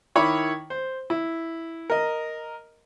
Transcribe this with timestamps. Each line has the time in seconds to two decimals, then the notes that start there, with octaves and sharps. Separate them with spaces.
0.15 D#3 E4 C#5 B5 D6
0.70 C5
1.10 E4
1.90 A#4 D#5